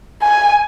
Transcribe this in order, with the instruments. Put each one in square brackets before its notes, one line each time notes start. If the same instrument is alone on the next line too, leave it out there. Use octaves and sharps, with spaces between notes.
[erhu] G#5